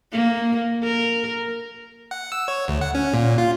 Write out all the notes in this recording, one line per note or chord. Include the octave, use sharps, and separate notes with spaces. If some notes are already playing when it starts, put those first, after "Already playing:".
A#3
A#4
F#5
E6
C#5
D2
F#5
C#4
A#2
F4